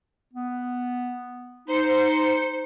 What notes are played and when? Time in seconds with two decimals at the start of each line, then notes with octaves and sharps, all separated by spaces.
0.33 B3
1.68 D#4 C5 C#7